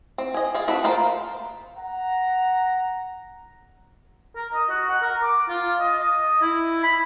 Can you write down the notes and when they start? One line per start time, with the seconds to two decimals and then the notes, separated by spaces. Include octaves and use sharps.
0.18 C4
0.34 D#5 G#5
0.54 F4 G#4
0.68 C4 F#4 A4 B4
0.84 A#3 F4 C5
1.76 F#5 A#5
4.36 A#4
4.54 D#5
4.70 F#4
4.89 F#5
5.02 A#4
5.23 D6
5.49 F4
5.80 D#5
6.00 D#5
6.42 E4
6.83 B5